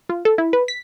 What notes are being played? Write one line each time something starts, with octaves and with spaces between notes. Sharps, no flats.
F4
A4
E4
B4
B6